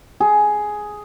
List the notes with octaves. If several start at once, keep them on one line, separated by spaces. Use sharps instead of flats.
G#4